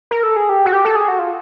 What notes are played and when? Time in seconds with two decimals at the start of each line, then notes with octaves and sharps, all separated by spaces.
0.11 A#4
0.23 A4
0.36 G#4
0.49 G4
0.66 F#4
0.73 G4
0.85 A4
0.96 G#4
1.08 F#4
1.19 F4